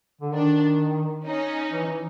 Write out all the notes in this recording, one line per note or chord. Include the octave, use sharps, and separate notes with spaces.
D3
D#3 D4
C#4 D#4
E3
E3